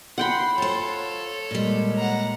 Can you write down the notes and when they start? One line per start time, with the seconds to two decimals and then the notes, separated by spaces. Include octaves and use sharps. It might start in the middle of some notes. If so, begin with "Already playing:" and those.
0.18 F#5 G5 B5 C6
0.58 F4 A4 C5 C#5
1.51 A#2 G3 G#3
1.98 F#5 A#5